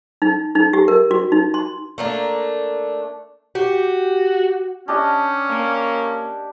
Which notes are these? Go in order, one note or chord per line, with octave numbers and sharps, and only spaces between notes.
D#4
D#4
G4
A#4
F#4
D#4
C6
A3 A#3 D4
F#4 G4
C#4 D4 G4 D#5
A#3